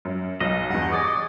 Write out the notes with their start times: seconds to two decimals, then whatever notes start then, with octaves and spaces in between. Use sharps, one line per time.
0.05 F#2
0.40 B1 D#5
0.70 E2 G2 F#5
0.91 G#4 C#6 D6 A6